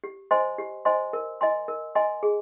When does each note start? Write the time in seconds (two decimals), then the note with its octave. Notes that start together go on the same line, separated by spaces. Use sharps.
0.04 G4
0.31 C5 D#5 G#5 C6
0.58 G4
0.85 C5 D#5 G#5 C6
1.13 A#4
1.41 D#5 G#5 C6
1.68 A#4
1.95 D#5 G#5 C6
2.23 G#4